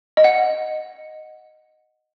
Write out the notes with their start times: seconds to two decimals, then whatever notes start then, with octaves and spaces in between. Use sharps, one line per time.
0.17 D#5
0.24 F#5